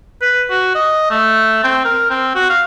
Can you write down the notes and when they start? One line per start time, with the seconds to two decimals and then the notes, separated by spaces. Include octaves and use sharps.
0.22 B4
0.50 F#4
0.75 D#5
1.10 A3
1.64 C4
1.85 A#4
2.10 C4
2.35 F#4
2.50 F5